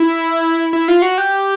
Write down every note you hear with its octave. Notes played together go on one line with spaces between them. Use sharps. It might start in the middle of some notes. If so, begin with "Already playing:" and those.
Already playing: E4
E4
F4
F#4
G4